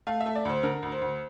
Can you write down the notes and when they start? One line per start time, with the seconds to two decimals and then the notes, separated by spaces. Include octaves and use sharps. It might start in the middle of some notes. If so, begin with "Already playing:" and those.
0.07 A3 F5
0.21 E5
0.26 A3
0.35 D5
0.45 D2 C5
0.63 D3 A#4
0.83 D2
0.92 C5
1.01 D2